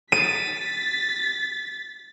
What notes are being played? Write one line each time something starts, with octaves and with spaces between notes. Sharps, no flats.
A6 B6 D#7